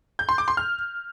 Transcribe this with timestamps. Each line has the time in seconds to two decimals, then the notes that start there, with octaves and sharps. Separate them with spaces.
0.19 G6
0.29 C6
0.38 D6
0.48 C6
0.57 F6